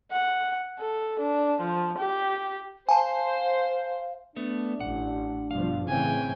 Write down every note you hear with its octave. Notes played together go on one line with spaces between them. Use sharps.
F#5
A4
D4
F3
G4
C5 F5 G#5 A5
A3 B3 D4
A1 F#5
G2 B2 F3 F5
A2 C#3 E3 C4 G5 G#5